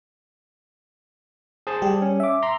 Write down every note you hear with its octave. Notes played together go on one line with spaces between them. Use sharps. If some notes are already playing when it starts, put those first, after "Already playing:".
G#4 C5 A5
G3 G4
C#4
E5 D6
A#5 C6